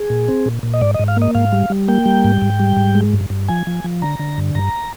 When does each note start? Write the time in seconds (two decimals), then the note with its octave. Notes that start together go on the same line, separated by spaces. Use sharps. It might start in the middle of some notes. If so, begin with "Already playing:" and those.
Already playing: G#4
0.10 A#2
0.28 C4
0.46 A#2
0.63 A#2
0.74 D#5
0.81 G#2 D5
0.94 D#5
0.99 G#2
1.08 F5
1.17 A#3
1.22 D#5
1.35 G#2 F5
1.52 G3
1.70 G3
1.88 A#3 G5
2.06 G3
2.24 G#2
2.42 G#2
2.59 G3
2.77 G#2
2.95 G#3
3.13 G2
3.30 G2
3.49 F3 G#5
3.67 F3
3.84 F3
4.02 D3 A#5
4.19 D3
4.38 G2
4.55 G2 A#5